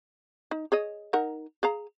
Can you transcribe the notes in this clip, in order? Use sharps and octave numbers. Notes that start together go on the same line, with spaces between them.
D#4
G#4 C#5 D#5
D#4 A#4 F#5
G#4 F5 A#5